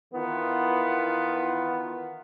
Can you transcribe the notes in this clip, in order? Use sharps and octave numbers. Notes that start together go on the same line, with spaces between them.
D#3 E3 B3 F4